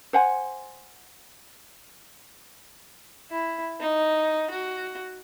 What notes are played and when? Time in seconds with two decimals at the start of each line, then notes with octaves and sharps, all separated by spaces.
0.13 C5 F#5 G#5
3.30 E4
3.80 D#4
4.50 F#4